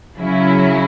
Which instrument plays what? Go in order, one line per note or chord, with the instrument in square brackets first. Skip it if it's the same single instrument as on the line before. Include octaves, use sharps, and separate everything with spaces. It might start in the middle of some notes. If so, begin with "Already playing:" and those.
[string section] C#3 F#3 C#4 E4